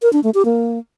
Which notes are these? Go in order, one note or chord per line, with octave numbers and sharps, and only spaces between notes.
A#4
D4
A3
G4
A#3